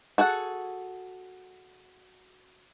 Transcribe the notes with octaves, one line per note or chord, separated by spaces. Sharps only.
F#4 G#4 A4 F#5